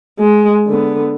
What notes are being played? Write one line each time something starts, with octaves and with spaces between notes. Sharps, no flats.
G#3
D3 B3